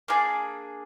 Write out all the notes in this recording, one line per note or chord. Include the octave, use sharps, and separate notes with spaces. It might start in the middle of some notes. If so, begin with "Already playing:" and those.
A#3 D4 G#4 D5